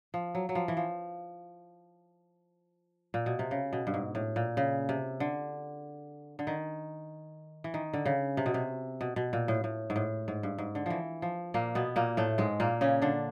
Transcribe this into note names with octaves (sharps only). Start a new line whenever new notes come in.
F3
F#3
F#3
F3
E3
F3
A#2
B2
C3
C#3
B2
G2
G#2
A2
A#2
C#3
C3
D3
D3
D#3
E3
D#3
D3
C#3
C3
B2
C3
B2
B2
A#2
A2
A2
G#2
A2
G#2
G2
G#2
D3
E3 F3
F3
A#2 A#3
B2 B3
A#2 A#3
A2 A3
G#2 G#3
A#2 A#3
C#3 C#4
D3 D4